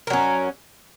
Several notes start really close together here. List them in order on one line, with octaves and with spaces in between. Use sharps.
A#4 F#3 C#4